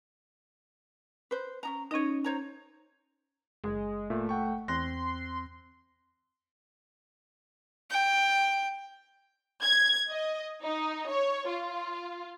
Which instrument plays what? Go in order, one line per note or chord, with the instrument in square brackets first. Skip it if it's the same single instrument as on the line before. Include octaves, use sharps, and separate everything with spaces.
[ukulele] B4 C5
C#4 D#4 A#5
[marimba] C#4 D#4 [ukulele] C#5 D#5
[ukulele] C5 C#5 A#5
[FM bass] F#1 [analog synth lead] G#3
[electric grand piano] A#2 [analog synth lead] A3
[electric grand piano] F#5 G5 C#6
[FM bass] E2 [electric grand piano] C4 F#6 A#6 [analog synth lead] C6
[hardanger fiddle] G5
[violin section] G#6
D#5
D#4
C#5
F4